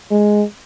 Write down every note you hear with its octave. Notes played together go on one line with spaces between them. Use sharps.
G#3